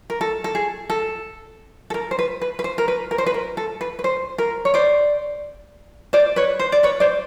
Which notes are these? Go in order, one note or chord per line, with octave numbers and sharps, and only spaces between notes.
A#4
A4
A4
G#4
A4
A4
A#4
C5
B4
B4
B4
C5
A#4
B4
A#4
C5
B4
A#4
A4
B4
B4
C5
A#4
C#5
C5 D5
C5 D5
B4 C#5
C5
D5
B4 C#5
C5 D5